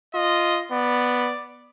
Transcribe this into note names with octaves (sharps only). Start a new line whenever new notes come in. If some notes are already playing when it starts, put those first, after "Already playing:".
F4 D#5
B3 D5